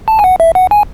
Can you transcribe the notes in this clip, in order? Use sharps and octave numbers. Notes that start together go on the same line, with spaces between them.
A5
G#5
F#5
E5
F#5
G#5